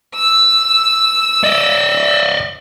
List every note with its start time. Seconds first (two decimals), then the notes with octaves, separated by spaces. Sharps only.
0.15 E6
1.44 D5 D#5